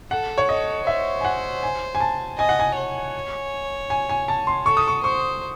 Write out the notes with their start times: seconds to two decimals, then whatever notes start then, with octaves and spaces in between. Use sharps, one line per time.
0.11 A4 F#5
0.38 C#5
0.49 A4 D#5
0.87 C5 E5
1.21 G#5
1.25 F#5
1.63 G#5
1.95 G#5
2.00 A5
2.38 D#5 G#5
2.49 F#5
2.59 G#5
2.77 C#5
3.90 G#5
4.09 G#5
4.28 A5
4.47 C6
4.66 A4 C#6
4.77 D#6
4.88 C#6
5.04 C5 C#6